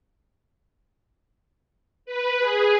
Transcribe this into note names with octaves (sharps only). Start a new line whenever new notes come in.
B4
G#4